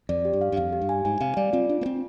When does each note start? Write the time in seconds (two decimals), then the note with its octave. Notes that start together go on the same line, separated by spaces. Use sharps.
0.09 F2 D5
0.25 G4
0.33 G2
0.41 F5
0.52 G2
0.57 F2 F5
0.73 G4
0.82 G2
0.89 G#5
1.05 G#2 G#5
1.21 C3 F5
1.37 G3 D5
1.53 C4 F4
1.69 D4 F4
1.81 A#3
1.86 C4 F4